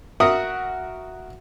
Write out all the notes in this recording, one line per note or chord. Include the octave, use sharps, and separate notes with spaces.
F#4 A#4 E5 F#5 D#6